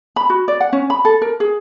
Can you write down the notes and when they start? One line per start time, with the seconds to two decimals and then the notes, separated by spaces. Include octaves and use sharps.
0.16 B5
0.30 F#4
0.48 D5
0.61 F#5
0.73 C#4
0.90 B5
1.05 A4
1.22 A#4
1.40 G#4